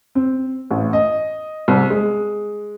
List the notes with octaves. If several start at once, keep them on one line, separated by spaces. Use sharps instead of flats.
C4
A1
D#5
C2
G#3